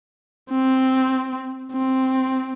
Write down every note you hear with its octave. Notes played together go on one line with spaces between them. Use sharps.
C4
C4